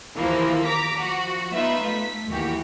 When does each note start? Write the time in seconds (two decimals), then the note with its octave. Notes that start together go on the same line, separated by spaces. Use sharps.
0.17 D#2 E3 F3 A#3
0.66 A#5 D6 B6
0.99 F3 F#4
1.53 B3 D#4 F4 B4 E5
1.85 A3 B6
2.30 D#2 E3 A#3 F#4 G4